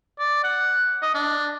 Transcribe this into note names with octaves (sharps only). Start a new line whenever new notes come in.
D5
F#5
D#5
D4